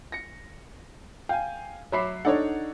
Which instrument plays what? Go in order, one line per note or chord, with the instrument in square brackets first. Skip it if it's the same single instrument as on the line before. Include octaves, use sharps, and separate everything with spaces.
[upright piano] A#6 C#7
[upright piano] F5 G#5 [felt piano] G5
[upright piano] F#3 E5 C7 [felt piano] C#5 B5 D6
[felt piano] D4 D#4 A4 [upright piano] C#5 D5 F#5